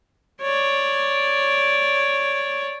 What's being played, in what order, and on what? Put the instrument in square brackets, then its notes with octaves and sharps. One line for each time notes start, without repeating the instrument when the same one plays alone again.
[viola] C#5 D5